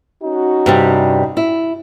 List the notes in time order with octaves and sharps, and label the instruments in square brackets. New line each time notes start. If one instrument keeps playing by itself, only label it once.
[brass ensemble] C#4 D#4 F#4
[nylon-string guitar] G2 C3 G3
E4